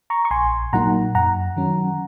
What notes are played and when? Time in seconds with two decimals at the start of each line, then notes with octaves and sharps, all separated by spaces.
0.10 A#5 C#6
0.25 C#6
0.31 A#1 G#5 C6
0.73 A#2 F#3 A#3 D#4 F#5 A#5
1.15 F#2 F#5 A#5
1.57 D#3 F#3 C#4